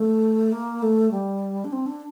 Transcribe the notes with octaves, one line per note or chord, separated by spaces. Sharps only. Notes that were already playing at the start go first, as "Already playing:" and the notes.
Already playing: A3
A#3
A3
G3
D4
C4
D4